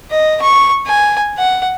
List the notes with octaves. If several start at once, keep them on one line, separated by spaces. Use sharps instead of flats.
D#5
C#6
G#5
F#5